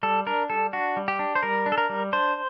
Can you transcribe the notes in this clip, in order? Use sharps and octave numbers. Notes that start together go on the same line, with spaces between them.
G3 A4
D4 A#4
G3 A4
D4 F#4
G3
G4
D4
C5
G3 A#4
D4
A4
A#4
G3
D4 C5